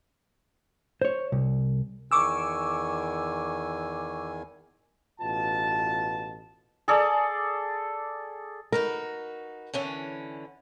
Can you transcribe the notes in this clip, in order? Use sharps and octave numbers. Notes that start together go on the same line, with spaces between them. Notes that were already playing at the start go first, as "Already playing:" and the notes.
C5 C#5
C2
E2 D#3 G#5 C#6 D6 E6
A1 B2 F4 A5
G#4 A4 D5
D#4 F#4 A#4 B4
D3 E3 C#4